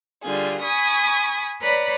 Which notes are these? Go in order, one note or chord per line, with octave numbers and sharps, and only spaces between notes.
D3 G3 F4 G#4
G#5 B5 C#6 D#6
B4 C#5 D5 A#5 B5